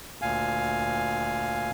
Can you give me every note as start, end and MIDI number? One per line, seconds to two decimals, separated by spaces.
0.22 1.71 38
0.22 1.71 46
0.22 1.71 77
0.22 1.71 80